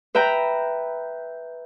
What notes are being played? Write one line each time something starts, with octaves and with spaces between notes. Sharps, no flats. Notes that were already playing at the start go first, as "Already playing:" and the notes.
B4 E5 G5 A#5